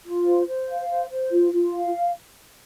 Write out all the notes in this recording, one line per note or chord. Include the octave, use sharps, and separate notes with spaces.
F4
C5
C5
F5
C5
C5
F4
F4
F5